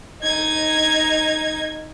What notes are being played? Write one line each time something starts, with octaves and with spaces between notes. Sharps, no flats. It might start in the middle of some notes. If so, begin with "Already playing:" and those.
D#4 G#6